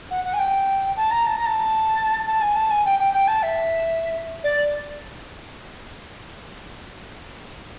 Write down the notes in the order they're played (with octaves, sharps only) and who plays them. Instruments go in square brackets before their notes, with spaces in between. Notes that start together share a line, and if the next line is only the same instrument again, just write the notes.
[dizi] F#5
F#5
G#5
G5
A5
A#5
A5
A#5
A5
A5
G#5
A5
G#5
G5
G5
G5
A5
E5
D5